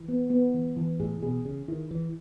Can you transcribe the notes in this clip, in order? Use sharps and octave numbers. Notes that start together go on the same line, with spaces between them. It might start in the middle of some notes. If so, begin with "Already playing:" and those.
Already playing: E3
B3
B3
E3
E3
A2 G#4
B2 G#4
C#3 G#4
D#3 E4
E3 E4